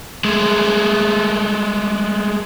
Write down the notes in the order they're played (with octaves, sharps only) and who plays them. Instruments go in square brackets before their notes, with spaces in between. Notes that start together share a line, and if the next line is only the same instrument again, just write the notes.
[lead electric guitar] G#3 A3